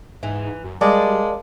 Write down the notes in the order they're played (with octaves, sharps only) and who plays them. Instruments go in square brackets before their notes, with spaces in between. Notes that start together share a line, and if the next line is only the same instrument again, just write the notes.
[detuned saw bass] G#2 [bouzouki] E3
[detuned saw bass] F#2
[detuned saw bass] G3 [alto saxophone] G#3 [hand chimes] A#4 F5 A5 [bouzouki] D5